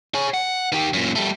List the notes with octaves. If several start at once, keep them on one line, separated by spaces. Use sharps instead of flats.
G#4 C#5
F#5
D#3 G4
F#2 A#2
G3 A3